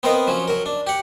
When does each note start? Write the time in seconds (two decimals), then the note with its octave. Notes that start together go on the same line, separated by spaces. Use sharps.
0.03 B3 C4 A#4 B4 D#5 F5
0.27 F3 F#3 C#4
0.48 F#3 A#4
0.66 D4
0.87 G4 F#5